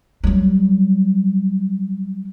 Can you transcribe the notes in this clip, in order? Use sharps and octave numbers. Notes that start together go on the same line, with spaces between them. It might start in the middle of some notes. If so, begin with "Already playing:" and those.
F#3 G3